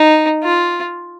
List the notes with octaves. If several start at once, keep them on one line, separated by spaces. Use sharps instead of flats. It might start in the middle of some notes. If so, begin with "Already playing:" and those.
Already playing: D#4
F4